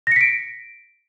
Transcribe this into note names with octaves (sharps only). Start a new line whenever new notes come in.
A#6 B6 C#7 D7